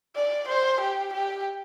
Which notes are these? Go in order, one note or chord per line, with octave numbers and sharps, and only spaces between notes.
D5
C5
G4
G4